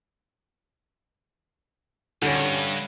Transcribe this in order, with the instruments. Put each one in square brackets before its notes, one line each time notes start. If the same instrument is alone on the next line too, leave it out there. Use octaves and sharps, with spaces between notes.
[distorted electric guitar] G2 [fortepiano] D3 C#4